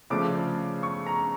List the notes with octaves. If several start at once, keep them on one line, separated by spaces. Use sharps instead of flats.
C#3 F3 A3 D4 D6
C#6
A#5